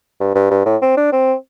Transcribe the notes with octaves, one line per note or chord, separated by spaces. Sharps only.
G2
G2
G2
A2
C4
D4
C4